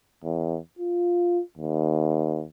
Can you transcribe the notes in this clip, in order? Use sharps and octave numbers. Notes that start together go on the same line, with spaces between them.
E2
F4
D#2